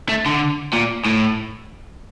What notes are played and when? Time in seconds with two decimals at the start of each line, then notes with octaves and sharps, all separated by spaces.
0.09 A3
0.26 D3
0.73 A#2
1.05 A2